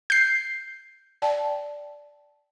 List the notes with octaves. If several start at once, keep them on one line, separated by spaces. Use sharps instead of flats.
G6 C7
D5 G5 A5